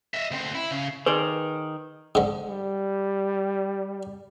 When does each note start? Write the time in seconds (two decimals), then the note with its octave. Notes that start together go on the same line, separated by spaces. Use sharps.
0.14 D#5 E5
0.31 D2 C4
0.55 E4
0.71 C#3
1.06 D#3 G#4 B4 C5 D5
2.15 G#2 D3
2.48 G3